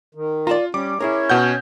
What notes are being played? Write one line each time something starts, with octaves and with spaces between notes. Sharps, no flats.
D#3
F4 D5 A5 A#5
G3 C#4 D6
C#4 E4 G#4 A#4 C#5
B2 F#5 G6